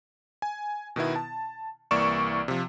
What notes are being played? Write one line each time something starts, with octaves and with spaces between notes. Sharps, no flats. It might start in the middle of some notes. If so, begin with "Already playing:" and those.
G#5
B2 D#3 B3 E4
A5
C2 E3 A#3 D5 C#6 E7
C3 F3